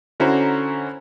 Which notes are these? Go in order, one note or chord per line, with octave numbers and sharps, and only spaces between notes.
D3 C#4 E4 F#4 C5 A#5